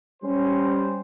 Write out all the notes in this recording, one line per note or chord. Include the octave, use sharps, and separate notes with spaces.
G3 C#4 C5